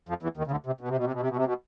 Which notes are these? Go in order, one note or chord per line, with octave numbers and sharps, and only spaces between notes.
F2 F3
E2 E3
D#2 D#3
C#3
D2 D3
C3
B2
C3
B2
C3
B2
C3
B2
C3
B2